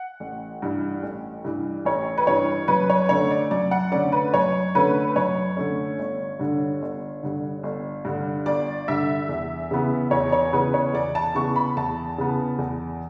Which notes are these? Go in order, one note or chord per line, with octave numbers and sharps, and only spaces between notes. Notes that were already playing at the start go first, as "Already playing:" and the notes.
Already playing: F#5
A1
G2 E3
A1
G2 E3
A1 C#5
B4
G2 E3 C#5
F#2 B4
C#5
D3 A3 C#4 C#5
D5
F#2 D5
F#5
D3 A3 C#4 D5
B4
F#2 C#5
D3 A3 C#4 B4
F#2 C#5
D3 A3 C#4
G1
G2 D3
G1
G2 D3
G1
G2 D3
G1 D5
G2 D3 E5
E2
C#3 E3 B3
E2 C#5
C#5
C#3 E3 B3 B4
C#5
E2 D5
A5
C#3 E3 B3 C#6
B5
E2 A5
C#3 E3 B3
E2